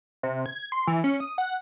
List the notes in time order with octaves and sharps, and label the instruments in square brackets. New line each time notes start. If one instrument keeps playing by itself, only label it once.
[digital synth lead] C3
G#6
C6
E3
C#4
D#6
F#5